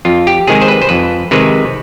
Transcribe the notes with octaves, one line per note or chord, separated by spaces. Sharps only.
F2 F4
G4
C3 D#3 G#3 G#4
C5
B4
C5
F2 B4
C3 D#3 G#3 B4